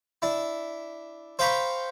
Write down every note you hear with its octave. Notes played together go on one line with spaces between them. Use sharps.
D4 E4
C5 F5 G5 A#5 B5 C#6